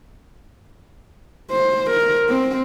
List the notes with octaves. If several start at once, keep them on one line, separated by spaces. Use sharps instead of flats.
C5
A#4
C4